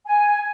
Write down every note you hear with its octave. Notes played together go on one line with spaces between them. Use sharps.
G#5